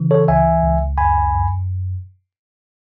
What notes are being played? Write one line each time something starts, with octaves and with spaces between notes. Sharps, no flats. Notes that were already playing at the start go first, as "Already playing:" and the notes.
Already playing: C#3 E3
A4 C#5
C#2 E5 G#5
C#2
F#2 G#5 B5
F#2